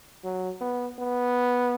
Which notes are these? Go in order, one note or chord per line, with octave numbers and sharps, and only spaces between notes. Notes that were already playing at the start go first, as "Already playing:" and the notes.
F#3
B3
B3